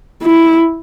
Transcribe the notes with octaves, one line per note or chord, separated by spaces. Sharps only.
E4